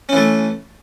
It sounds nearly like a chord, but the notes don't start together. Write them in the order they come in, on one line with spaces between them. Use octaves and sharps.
C#4 E3 A3